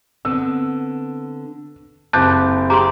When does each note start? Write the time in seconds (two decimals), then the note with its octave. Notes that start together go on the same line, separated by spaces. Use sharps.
0.25 D3 B3 C4 E6
2.13 F#1 C4 G4 A5 D6 F#6 G6 A6
2.70 G4 G#4 G5 A#5 C6